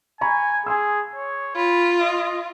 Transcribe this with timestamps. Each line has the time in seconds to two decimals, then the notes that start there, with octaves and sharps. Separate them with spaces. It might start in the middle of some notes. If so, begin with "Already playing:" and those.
0.21 G#5 A#5 B5 C#6
0.66 G#4 G#5 C6 E6
1.16 C#5
1.56 F4 B5
2.00 D#5